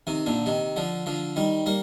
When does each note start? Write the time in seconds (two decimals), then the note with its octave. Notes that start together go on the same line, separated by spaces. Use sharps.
0.07 C3 D#3
0.26 A#2 D3
0.46 C3 D#3
0.76 D3 F3
1.06 D3 F3
1.36 D#3 G3
1.66 G3 A#3